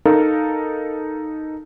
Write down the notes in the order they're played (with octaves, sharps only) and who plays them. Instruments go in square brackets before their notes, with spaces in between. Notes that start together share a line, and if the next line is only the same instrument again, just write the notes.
[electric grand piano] D#4 A4 A#4 F5